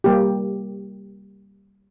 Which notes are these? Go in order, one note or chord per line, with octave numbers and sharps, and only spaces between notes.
G3 A#3 G4